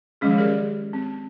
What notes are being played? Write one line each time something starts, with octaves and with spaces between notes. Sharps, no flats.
D#3 F3 F#3 G#3 C#4 G#4
G4 G#4 A#4 D5
C4